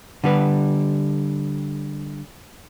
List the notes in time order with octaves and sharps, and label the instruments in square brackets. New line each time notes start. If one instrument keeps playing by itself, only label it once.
[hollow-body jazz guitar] D3 G3 B4